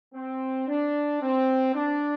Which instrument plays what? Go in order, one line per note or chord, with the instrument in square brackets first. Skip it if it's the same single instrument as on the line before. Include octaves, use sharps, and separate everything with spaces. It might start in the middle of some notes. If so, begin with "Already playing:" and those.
[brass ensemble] C4
D4
C4
D4